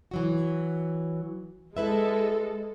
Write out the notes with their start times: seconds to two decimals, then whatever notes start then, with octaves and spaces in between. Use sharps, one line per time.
0.11 E3 F#3 F#4
1.77 G#3 E4 A4 B4 E5